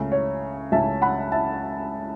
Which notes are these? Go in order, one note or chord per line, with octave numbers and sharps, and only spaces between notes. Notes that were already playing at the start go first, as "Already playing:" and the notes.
Already playing: C#2 C#3 A3 C#4
C#5
C#2 C#3 A3 C#4 E5 A5
F#5 B5
E5 A5